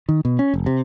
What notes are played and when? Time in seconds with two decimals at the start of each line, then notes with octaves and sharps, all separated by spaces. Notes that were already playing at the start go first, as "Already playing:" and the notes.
0.09 D#3
0.25 B2
0.39 C#4
0.54 F1
0.66 C3